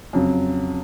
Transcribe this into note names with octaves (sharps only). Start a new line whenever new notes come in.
F2 C#3 F#3